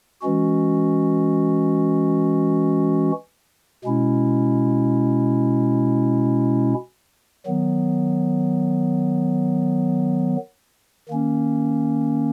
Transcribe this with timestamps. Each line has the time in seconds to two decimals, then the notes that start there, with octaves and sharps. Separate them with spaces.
0.22 E3 G#3 C#4 F#4
3.84 B2 G#3 C#4 E4
7.46 D#3 F#3 B3
11.09 D#3 A#3 C#4